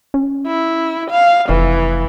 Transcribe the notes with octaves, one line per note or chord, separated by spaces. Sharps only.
C#4
E4
F5
F1 E3